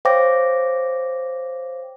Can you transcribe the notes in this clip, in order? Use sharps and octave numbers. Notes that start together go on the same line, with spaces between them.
C5 C#5 F5 G5 D6 A#6